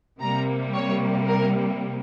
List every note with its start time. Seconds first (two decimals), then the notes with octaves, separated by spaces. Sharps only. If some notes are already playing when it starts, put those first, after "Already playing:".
0.21 C3 G3 A#3 A#5
0.74 C#5
1.28 A#4